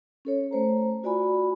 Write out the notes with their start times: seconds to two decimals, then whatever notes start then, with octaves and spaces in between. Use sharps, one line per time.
0.25 C#4 A4 C#5
0.51 A3 C5 A#5
1.03 F4 F#4 D5 G#5 B5